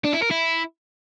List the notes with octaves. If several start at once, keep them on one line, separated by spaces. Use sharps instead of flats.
D4
E4
A#4
E4